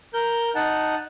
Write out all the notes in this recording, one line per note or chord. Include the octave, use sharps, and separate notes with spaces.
A#4 G6
D#4 F#5 A5